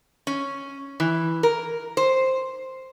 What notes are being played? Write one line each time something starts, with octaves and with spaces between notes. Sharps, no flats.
C#4
E3
A#4
C5